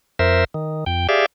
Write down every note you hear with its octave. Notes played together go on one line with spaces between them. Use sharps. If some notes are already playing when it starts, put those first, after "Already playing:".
F2 A#4 C5 E5
D#3
F2 G5
G4 G#4 D5 E5 F5